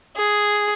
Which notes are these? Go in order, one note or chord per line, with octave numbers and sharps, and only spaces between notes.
G#4